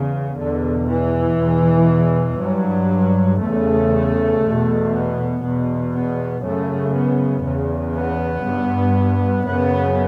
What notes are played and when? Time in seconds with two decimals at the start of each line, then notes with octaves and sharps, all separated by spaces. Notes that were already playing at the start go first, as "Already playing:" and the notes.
Already playing: E2 C#3
0.37 E2 B2 D3
0.88 E3
1.39 E2 B2
2.39 G2 F#3
3.40 E2 C#3 A3
4.42 E2 B2
4.92 B3
5.43 E2 B2
5.92 B3
6.43 F#2 C#3 A3
6.94 B3
7.44 E2 C#3
7.95 B3
8.45 G2
9.46 F#2 C#3 B3